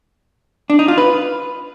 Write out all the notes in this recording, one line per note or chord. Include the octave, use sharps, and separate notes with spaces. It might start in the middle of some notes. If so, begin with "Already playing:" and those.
D4
D#4
F4
B4